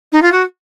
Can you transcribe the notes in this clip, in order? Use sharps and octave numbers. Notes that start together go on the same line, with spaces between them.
D#4
F4
F#4